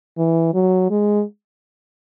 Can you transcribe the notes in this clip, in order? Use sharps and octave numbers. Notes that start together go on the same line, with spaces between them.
E3
F#3
G#3